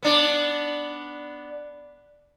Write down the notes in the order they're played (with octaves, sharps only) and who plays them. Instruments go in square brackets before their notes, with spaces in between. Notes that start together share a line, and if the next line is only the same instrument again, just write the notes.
[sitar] B3 D4